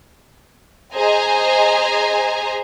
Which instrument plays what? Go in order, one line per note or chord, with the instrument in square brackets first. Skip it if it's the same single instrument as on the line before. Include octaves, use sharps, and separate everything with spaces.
[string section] G#4 C5 D#5 G#5 A#5